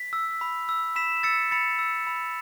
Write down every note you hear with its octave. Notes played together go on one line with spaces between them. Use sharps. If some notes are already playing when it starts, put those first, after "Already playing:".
Already playing: B6
E6
B5
E6
B5 B6 E7
E6 A6 C#7
B5 A6 C#7
E6
B5